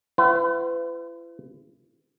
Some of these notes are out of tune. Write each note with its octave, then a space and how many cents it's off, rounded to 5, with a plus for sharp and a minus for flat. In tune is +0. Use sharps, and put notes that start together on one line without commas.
E4 +45 B4 +40 F#5 +35